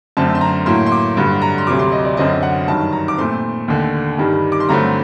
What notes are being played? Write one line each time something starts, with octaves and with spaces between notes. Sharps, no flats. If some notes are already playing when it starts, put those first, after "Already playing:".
F#2 D3 A3 C4 A5
C6
A#5
A2 F#3 A#3 C6
C6
D6
G2 D3 F#3
A#5
C6
D2 C3 F#3 D6
C6
D#5
D5
F#2 D3 F#3 C4 D#5
F#5
G2 D#3 F#3 A5
A#5
D6
A#2 A3 C4 C6
D#2 D3 A3
G2 D#3 G3
D6
C6
G2 D3 F#3 A3 C4 A#5